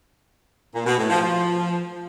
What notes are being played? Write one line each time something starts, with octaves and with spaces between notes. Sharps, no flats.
A#2
B2
A2
F3
F3